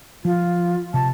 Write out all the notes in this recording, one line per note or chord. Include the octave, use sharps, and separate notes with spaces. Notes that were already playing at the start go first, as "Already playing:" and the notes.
F3 F4
C3 A5